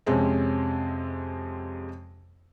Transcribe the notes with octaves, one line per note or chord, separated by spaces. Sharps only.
F2 C3 G#3 C4 C#4